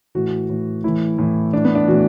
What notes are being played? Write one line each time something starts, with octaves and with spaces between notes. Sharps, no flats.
A2 E3 F#4
A2 E3
A2 E3 E4
A2 E3
A2 E3 D4
B3
D4
A2 E3 F#4